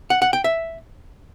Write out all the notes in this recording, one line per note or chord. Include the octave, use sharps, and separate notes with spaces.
F#5
F#5
G5
E5